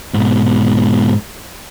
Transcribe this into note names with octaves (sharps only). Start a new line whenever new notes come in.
G#2 B2